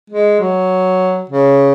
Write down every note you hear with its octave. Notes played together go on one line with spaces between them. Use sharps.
G#3
F#3
C#3